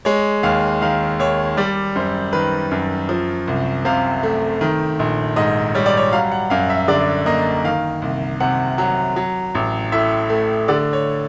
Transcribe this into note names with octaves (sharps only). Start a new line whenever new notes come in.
G#3 C#5
D#2 F5
D#3 F5
D#2 C#5
G3 D5
F#2 C5
D#3 B4
F#2
F3
C2
C3 F5
A3
D#3
A#1
G#2 D#5
G3 C#5
D5
C#5
F#3 F5
F#5
F#2 F5
E5
D3 D5
A#3 D#5
D#3 F5
C2
C3 F#5
F#3
F#3
A1
A2 E5
A3
D3 D5
C#5